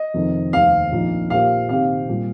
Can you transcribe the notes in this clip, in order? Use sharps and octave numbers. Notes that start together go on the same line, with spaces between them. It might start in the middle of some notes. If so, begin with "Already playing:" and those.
Already playing: D#5
F2 C3 D#3 C4
F1 D#2 D#3 C4 F5
A#1 A#2 F3 D#4
A#2 A#3 G4 C5 F5
C3 D#3 C4 G4 F5
A#2 G3